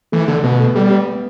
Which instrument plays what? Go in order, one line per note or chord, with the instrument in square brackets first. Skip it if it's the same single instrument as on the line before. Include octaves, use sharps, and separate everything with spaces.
[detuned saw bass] E3 [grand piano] A3
[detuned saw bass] D3 [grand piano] A3
[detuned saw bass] B2 [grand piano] B3
[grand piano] A3
[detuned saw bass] G3 [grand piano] A3
[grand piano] B3